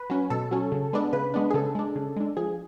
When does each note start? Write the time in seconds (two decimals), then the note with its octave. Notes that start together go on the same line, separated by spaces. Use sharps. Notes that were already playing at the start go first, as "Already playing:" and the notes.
Already playing: B4
0.10 F#3 C#4
0.30 B2 A4
0.51 F#3 C#4
0.72 C#3
0.93 G#3 B3 D4
1.13 C#3 B4
1.34 G#3 B3 D4
1.50 G#4
1.54 C#3 A4
1.75 G#3 D4
1.96 C#3
2.16 G#3 D4
2.37 F3 G#4